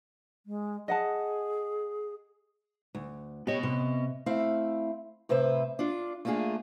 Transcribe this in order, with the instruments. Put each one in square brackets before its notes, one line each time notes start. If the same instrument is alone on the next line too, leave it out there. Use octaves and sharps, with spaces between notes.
[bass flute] G#3
[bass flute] G#4 [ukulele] D#5 F#5 A5
[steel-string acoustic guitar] D2
[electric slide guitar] B3 D#5 [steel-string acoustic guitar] G4 C#5
[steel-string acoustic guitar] C3
A3 C4 E4 F5
A2 C3 B4 C5 E5
D4 F4
A3 A#3 D4 F4 G#4